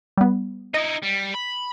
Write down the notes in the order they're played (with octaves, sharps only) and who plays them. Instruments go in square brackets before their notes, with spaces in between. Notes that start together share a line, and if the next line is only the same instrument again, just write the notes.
[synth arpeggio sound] G3 B3
[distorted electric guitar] D#4 E4 [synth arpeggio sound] D#5
[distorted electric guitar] G3
B5